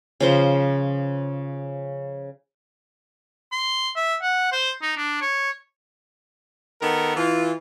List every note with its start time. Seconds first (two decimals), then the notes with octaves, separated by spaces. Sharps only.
0.20 C#3 F3 C5
3.52 C6
3.96 E5
4.22 F#5
4.52 C5
4.82 D#4
4.97 D4
5.21 C#5
6.81 D#3 B3 A4 A#4
7.16 E3 F4